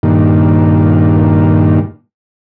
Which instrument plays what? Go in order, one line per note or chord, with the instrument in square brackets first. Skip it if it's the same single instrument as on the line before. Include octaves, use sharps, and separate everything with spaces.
[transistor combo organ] G2 A#2 D#3